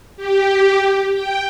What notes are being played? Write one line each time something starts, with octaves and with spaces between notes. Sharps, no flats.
G4
G5